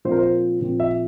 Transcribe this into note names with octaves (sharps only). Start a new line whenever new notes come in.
A#2 F3 C4 C5
A#4
C5
A#2 F3 C4
E5